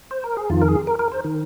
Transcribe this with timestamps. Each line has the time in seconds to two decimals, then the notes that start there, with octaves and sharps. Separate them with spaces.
0.11 C5
0.24 A#4
0.37 G#4
0.50 F2 D#3 F4
0.62 A#4
0.68 G#4
0.87 A#4
0.99 A#4
1.12 C5
1.24 D#3